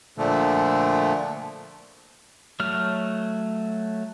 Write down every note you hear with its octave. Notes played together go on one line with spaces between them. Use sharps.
A#2 D3 F3 A3
F#3 A3 F6